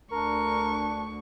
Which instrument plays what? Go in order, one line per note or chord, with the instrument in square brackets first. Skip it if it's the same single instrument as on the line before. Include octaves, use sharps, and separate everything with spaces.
[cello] D2 [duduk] D4 [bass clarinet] A#4 [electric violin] C#6